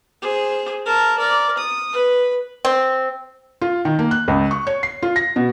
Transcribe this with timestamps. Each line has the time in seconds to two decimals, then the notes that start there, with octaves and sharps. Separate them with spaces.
0.22 G#4 C5
0.86 A#4 A5
1.19 A#4 D5
1.58 D#6
1.93 B4
2.65 C4
3.61 F4
3.85 D#3
3.99 A#3
4.11 F#6
4.28 C#2
4.51 C#6
4.67 C#5
4.83 C7
5.02 F4
5.16 A#6
5.36 B2